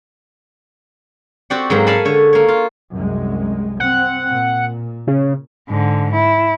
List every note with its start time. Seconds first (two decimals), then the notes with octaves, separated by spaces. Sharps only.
1.50 C4 F#4 G4 D5 F#5
1.70 G#2 F#3 A#3 G#4
1.87 D5 F5 F#5 G#5 A5 B5
2.05 D3 C#5
2.33 A#3 C#5
2.48 F4
2.94 C2 F#2 G#3
3.80 C4 F#5
4.30 A#2
5.07 C#3
5.69 G#2 D3
6.13 E4